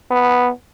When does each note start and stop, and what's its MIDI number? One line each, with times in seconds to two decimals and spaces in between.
0.10 0.50 59